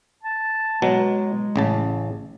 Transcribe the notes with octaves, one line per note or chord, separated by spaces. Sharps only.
A5
B2 F#3 G#3
A1 C#3 A5